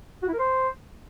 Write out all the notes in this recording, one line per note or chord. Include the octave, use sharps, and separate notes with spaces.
F#4
E4
A#4
C5